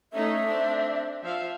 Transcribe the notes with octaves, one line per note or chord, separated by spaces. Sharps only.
A3 C#4 D#4 E5
C4 D4
F3 E5 F5